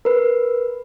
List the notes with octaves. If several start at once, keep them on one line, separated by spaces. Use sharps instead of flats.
A#4 B4